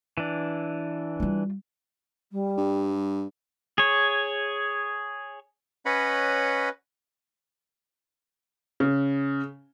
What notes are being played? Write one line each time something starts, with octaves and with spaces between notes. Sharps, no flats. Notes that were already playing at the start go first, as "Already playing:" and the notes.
E3 D4
G3 F4
G3
G2
G#4 C#5
C#4 B4 C#5 D#5 F#5 B5
C#3